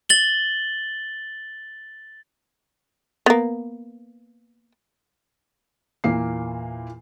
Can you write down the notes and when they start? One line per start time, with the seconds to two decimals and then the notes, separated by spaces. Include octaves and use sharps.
0.09 A6 F#7 G7
3.26 A#3 B3
6.04 E2 A#2 A#3 C7